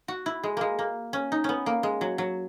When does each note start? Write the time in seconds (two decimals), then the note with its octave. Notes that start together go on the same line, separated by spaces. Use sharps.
0.08 F#4
0.26 E4
0.44 G#3
0.57 G#3 A#3
0.79 A#3
1.13 C#4
1.32 D#4
1.44 B3 C#4
1.66 A#3
1.83 G#3
2.01 F#3
2.18 F#3